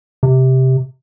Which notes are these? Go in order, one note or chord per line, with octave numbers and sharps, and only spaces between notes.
C3